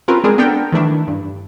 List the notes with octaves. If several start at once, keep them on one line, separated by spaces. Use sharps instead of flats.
C4 C#4 F4 A#4 B4
G#3 C4 D4 G#4 A#4
B3 D4 A4 A#4 G5
D#3 E3 A3 D4 E4
G2